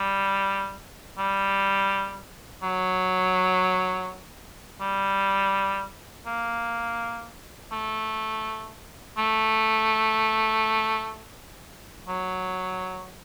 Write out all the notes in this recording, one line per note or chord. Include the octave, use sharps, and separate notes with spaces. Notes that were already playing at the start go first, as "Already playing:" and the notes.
Already playing: G3
G3
F#3
G3
A#3
A3
A3
F#3